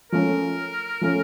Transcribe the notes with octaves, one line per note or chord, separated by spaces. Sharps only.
F3 A3 C#4 A#4
F3 A3 C#4